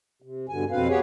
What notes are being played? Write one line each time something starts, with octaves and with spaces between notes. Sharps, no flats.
C3
G2 B2 D3 G#5
F2 B2 C4 B4 F5
B3 G4 G#4 C#5